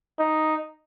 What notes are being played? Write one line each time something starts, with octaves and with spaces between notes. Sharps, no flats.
D#4